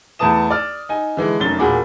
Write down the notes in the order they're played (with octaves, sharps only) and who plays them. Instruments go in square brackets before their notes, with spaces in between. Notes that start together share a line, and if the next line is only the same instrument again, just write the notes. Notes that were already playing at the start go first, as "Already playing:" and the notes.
[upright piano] E2 A3 B3 A5 D#6 E7
D5 E6 F6
D#4 G#5
D3 E3 G#3
F1 F#2 A6 G7
E1 A#2 F#4 G#4 B5 D6